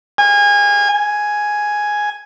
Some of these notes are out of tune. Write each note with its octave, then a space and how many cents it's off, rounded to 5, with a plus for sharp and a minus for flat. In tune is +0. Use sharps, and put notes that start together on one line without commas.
G#5 -25
G#5 +5